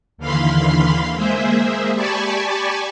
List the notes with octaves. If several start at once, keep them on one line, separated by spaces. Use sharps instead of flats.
D#2 D3 E3 F5 B5 C6
G#3 A#3 G#4 C5 E5
G4 D5 G#5 A5 B5 C#6